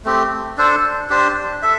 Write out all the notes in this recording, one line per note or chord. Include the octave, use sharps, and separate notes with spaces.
A3 C4 G4
D4 A4 C5
D4 G4 C5
A4 E5